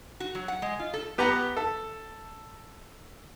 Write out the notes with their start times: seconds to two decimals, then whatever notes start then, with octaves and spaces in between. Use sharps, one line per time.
0.20 F#4
0.35 F#3
0.48 F#5
0.62 G#3
0.79 F4
0.94 A4
1.18 B3 G4 B4 F#5 A#5
1.57 A4